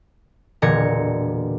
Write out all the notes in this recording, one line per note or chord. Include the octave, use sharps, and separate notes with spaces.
E1 A#2 D3 A#5 G#6 C#7